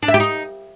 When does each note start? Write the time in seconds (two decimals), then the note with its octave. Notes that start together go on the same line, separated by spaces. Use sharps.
0.03 D4
0.08 E5
0.14 G4
0.20 D#4